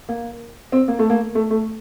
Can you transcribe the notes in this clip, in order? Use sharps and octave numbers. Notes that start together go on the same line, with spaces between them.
A#3
C4
A#3
A3
A#3
A3
A3